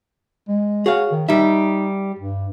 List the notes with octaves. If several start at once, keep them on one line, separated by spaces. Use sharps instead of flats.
G#3
F#4 G#4 C#5 F5
D#3
G3 D#4 E5
G2